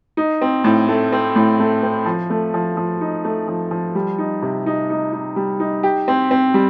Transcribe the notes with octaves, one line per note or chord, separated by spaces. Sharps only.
D#4
C4
A2
A3
C4
A2
A3
C4
F3
A3
F3
F3
D#4
A3
F3
F3
G3
D#4
C3
D#4
D#4
D#4
G3
D#4
G4
C4
C4
G3